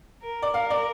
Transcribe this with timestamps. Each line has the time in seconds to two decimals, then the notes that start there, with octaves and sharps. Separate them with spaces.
0.22 A#4
0.42 D5
0.54 A#4 F5
0.70 D5